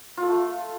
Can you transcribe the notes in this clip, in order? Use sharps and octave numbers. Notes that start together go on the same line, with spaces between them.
F4
A4
A3